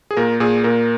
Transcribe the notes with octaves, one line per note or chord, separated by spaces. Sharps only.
G#4
A#2 A#4
A#2 G#4
A#2 A#4